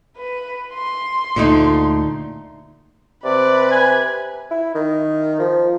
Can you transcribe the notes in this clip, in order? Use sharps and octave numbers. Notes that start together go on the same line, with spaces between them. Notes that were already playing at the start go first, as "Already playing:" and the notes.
B4
C6
D2 A#2 D3 A3 D#4
C3 B4 D5
G#5
E4
D#3
F3